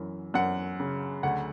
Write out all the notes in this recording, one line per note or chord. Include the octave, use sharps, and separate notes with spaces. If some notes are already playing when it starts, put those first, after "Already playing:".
Already playing: F#2 E3
F#2 F#5
C#3
D2 F#5